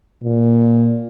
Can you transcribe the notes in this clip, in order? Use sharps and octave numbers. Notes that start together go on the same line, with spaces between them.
A#2